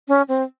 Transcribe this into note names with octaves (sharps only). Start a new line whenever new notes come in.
C#4
C4